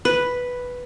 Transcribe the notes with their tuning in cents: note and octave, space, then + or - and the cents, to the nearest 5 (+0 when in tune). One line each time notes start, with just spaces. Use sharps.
B4 +0